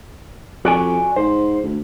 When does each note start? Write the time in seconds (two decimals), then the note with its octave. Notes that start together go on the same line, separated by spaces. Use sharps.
0.65 F2 F#4 D5 G#5
1.16 G#2 C5
1.64 D2